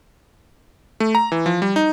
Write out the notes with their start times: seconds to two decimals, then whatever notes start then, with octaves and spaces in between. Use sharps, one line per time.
1.00 A3
1.15 A#5
1.32 E3
1.46 F3
1.62 G3
1.76 D#4